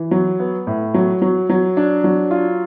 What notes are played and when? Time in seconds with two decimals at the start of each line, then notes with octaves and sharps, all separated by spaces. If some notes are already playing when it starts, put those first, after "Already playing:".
Already playing: E3
0.11 F#3
0.40 B3
0.67 A2
0.94 F#3
1.22 F#3
1.49 F#3
1.77 D4
2.04 F#3
2.31 F4